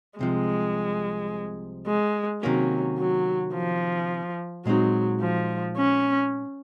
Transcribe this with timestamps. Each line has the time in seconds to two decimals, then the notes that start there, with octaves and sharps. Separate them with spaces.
0.19 C2 C3 F3 G#3
1.87 G#3
2.42 C3 D#3 F#3 A#3 C#4
2.98 F#3
3.54 F3
4.66 A#2 F#3 G#3 C4 D#4
5.21 F3
5.77 C#4